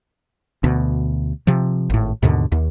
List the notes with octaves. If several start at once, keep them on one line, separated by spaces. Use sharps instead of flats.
D2 B2
C3 F3
G#1 A2
D#2 G#2 B2 D3
D#2